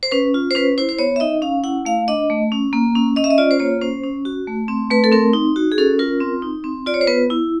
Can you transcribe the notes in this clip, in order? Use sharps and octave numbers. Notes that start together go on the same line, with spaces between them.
C5
C#4 B4
F4
C5
C#4 B4
E4 C5
C5
B3 C#5
E5
D#4 D#5
C#4 F5
E4 F#5
A3 F5
D4 D#5
A3
C#4
A#3
C#4
C#4 D#5
E5
D#5
F4 D5
C5
A#3 C#5
C#4 C5
C#4
F#4
A3
C4
A3 B4
A4
C4 A#4
D#4
F#4
G#4
C#4 A4
F4 A#4
C4
D#4
C4
F4 D5
C#5
C5
B3 B4
E4